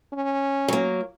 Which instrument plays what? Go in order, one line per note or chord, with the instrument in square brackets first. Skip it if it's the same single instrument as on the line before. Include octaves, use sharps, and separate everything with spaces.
[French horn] C#4
[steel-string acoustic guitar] F#3 A#3